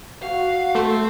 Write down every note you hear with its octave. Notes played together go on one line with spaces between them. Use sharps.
F#4 F5
A3 C4